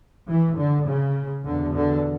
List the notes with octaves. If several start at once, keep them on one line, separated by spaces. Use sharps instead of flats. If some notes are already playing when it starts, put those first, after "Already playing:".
E3
D3
C#3
E2 B2 D3
D3